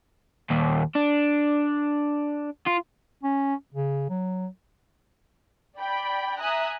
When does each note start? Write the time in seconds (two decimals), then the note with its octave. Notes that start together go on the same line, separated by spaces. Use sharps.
0.50 D#2 A#2
0.95 D4
2.66 F4
3.23 C#4
3.74 C#3
4.10 F#3
5.77 D5 G5 B5
6.39 E5 G#5 A#5 D#6 F#6